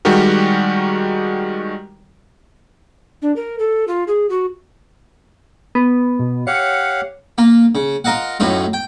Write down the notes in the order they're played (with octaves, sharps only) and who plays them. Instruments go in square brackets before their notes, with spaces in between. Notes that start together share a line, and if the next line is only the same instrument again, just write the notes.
[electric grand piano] D#3 G3 G#3 F#4 G4 A#4
[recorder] D4
A#4
A4
F4
G#4
F#4
[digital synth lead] B3
[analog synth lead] B2
[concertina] G4 F5 F#5 [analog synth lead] C#5 [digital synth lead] C#7
[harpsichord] A#3 F4
C#3
F4 A#4 D#5 F5 F#5
F#2 A2 D#4 F4
G5